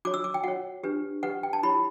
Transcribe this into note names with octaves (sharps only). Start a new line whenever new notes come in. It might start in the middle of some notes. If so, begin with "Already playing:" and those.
F#4 C#5 D6
E6
D6
G5
F#4 C#5 F#5
D4 G4 B4
D4 G4 B4 F#5
G5
A5
E4 G4 C#5 B5